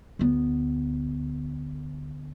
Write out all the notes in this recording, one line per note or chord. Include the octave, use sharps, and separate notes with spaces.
D2 B3